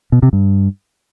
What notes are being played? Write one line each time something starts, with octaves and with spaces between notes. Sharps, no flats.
B2
C3
G2